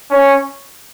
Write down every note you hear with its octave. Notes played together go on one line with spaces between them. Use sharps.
C#4